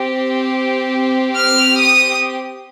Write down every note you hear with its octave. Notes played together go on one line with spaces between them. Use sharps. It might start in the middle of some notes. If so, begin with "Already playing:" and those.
Already playing: C4 G4
F6
D#6